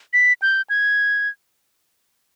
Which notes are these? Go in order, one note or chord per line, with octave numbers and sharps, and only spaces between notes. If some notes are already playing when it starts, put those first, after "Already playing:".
B6
G6
G#6